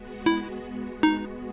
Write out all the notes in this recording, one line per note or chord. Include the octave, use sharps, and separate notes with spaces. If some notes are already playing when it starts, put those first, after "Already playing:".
Already playing: G#3 B3 F#4
E4
D#4